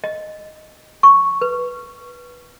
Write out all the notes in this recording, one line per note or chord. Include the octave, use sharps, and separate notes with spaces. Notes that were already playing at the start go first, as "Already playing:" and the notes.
D#5
C#6
B4